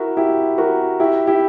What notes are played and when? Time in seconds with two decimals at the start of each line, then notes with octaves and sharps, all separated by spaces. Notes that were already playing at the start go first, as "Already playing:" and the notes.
Already playing: E4 F#4 A#4
0.17 E4 G4
0.58 F#4 A#4
1.00 E4 G4
1.27 E4 G4